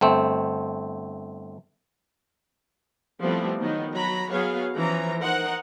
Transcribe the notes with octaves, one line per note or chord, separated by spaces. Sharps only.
G1 A3 C4
F3 G3 A3 B3 C4 E4
D#3 F#3 B3 D#4
F#3 A#5 B5
F#3 B3 G#4 C#5 F5
E3 F3 C#4 A#5
D#4 A#4 C5 F#5